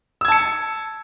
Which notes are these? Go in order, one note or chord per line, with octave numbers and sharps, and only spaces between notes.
A5 E6 G#6 C#7